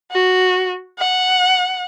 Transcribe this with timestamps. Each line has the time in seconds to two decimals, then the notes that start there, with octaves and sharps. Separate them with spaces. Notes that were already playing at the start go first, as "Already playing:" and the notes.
0.12 F#4
0.99 F#5